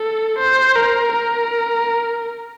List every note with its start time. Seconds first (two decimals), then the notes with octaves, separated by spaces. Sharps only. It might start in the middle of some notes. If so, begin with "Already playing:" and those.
Already playing: A4
0.39 C5
0.76 A#4
1.12 A#4